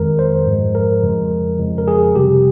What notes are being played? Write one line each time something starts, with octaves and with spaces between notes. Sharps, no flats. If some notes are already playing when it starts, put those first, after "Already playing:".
Already playing: F2 D#3 G#3 A#4
C5
G#2 F3 G#3
A#4
F2 C#3 F3 G#3
F2 C#3 F3 G#3
A#4
G#4
C3 G3 G4